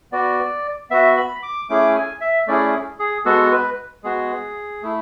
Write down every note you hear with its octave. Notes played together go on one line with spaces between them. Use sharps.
B3 F#4 D5
B3 F#4 E5
B5
D6
A3 C#4 E4 G#4 D6
G#5
E5
A3 C#4 E4 G#4 D5
G#4
G#3 B3 F#4 A4
B4
G#3 B3 F#4 G#4
A3 E4